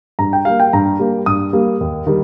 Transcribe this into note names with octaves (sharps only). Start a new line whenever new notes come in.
G2 A#5
G5
G3 A#3 F5
G5
G2 A#5
G3 A#3
G2 D#6
G3 A#3
D#2
D#3 G3